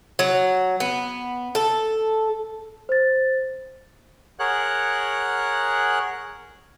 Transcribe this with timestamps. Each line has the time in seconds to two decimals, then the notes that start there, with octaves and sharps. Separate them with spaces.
0.19 F#3
0.80 B3
1.55 A4
2.89 C5 A6
4.39 G#4 A#4 C#5 F#5 F#6